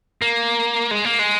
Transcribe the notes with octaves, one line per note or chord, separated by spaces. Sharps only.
A#3
G#3
A#3
G#3